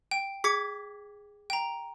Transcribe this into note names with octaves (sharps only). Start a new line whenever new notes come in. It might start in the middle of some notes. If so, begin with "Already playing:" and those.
G5
G#4 D6 G#6 B6
G5 A#5